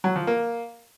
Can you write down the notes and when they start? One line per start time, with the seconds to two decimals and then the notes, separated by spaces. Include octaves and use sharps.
0.04 F#3
0.16 F3
0.27 A#3